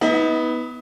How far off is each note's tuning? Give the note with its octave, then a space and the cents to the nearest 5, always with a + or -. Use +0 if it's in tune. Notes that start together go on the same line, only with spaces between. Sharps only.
B3 +0 D#4 +40